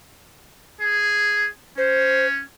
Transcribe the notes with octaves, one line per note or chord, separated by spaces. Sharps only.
G#4
C#4 C5